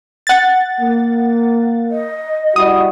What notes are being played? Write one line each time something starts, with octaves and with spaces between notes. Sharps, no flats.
F#5 A6
A#3
D#5
G3 E4 F#4 D#6